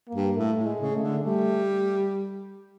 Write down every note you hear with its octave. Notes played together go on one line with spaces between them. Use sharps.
A#3
G2
A2 A3
A2
G#3
C#3
A3
D3
G3 A3